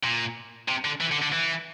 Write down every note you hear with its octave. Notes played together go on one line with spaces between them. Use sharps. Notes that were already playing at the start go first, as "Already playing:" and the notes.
A#2
C3
D3
E3
D3
D3
E3